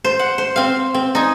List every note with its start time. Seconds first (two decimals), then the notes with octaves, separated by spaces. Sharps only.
0.04 C5
0.19 F#5
0.38 C5
0.56 C4 F5
0.94 C4
1.15 D#4 G#5